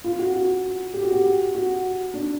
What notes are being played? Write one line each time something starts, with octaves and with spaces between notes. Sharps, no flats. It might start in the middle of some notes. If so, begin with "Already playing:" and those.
F4
F#4
F#4
G4
F#4
G4
F#4
D4